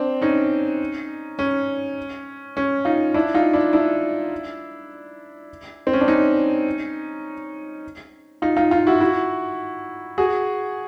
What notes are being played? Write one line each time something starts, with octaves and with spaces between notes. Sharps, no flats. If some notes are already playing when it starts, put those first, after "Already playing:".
Already playing: C4 D4
C#4 D#4
C#4
C#4
D#4 F4
D4 E4
D#4 F4
D4 E4
D4 E4
C4
C#4
D4
C#4 D#4
D#4 F4
D#4 F4
D#4 F4
E4 F#4
E4 F#4
F#4 G#4